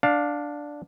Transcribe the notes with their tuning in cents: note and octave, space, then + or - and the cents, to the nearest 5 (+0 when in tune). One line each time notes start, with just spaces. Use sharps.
D4 +0 F5 +20